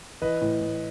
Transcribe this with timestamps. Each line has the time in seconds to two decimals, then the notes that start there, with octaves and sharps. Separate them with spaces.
0.22 E3 B4 D#5
0.41 A2
0.61 A2